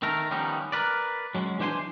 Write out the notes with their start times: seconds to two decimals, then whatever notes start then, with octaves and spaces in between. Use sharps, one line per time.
0.02 D#3 A3 A#4
0.31 D#3 F3 G3 B3 C#4 D#4
0.72 A#4 B4 D5
1.35 F#3 G#3 C#4
1.59 E3 D4 C5 G5 G#5 C6